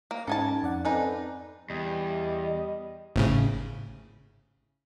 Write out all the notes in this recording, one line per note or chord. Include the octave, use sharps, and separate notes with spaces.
A#3
G#2 C#4 D#4 A4 G#5 A5 G#6
F2 D5 F#5
C4 D4 D#4 A4 B4 D5 G#5
E2 G3 D#5
G#1 A2 C#3